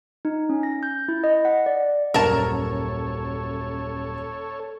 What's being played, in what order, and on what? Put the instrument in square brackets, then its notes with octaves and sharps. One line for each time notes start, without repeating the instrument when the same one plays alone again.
[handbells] D#4
C#4
A#6
G6
E4
D#5
F#5
D5
[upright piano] D#1 F#2 [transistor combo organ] A4 C#5 [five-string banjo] A#4 A5